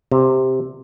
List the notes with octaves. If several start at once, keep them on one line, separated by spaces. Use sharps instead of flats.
C3